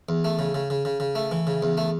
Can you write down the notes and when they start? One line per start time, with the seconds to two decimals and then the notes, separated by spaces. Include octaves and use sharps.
0.09 E2
0.24 A3
0.39 C#3
0.55 C#3
0.70 C#3
0.85 C#3
1.00 C#3
1.15 A3
1.31 E3
1.47 C#3
1.63 E2
1.77 A3